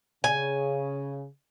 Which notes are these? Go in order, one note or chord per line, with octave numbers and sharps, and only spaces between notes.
C#3 G#5